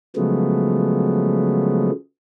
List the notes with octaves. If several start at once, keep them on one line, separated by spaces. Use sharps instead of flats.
C#3 F3 F#3 G#3 A3 B3